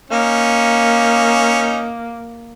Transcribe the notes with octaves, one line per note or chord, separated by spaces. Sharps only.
A#3 C#4 D#4